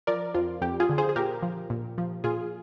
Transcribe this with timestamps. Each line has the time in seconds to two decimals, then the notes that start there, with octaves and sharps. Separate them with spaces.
0.07 F3 A#4 D5
0.34 F2 F4
0.61 F2 G4
0.80 F4 G#4
0.89 D3
0.98 G#4 C5
1.09 G#4
1.16 A#2 G4 A#4
1.43 F3
1.70 A#2
1.98 F3
2.24 A#2 F4 G#4